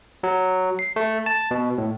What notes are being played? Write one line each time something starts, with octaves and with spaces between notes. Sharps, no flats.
F#3
C7
A3
A5
B2
A2